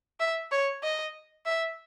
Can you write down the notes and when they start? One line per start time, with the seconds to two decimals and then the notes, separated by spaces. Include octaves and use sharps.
0.20 E5
0.52 C#5
0.83 D#5
1.46 E5